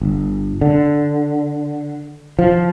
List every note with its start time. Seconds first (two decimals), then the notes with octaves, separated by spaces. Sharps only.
0.01 G1
0.61 D3
2.39 F3